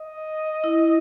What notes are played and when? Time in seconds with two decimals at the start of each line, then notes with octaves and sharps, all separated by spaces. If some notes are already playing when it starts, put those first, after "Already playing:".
Already playing: D#5
0.64 E4